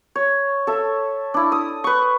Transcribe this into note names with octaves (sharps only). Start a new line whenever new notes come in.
C#5
A4 E5
D4 E4
D#6
B4 C#6